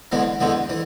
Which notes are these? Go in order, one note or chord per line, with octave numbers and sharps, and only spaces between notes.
E2 D3 G#3 B3
E2 D3 G#3 B3
E3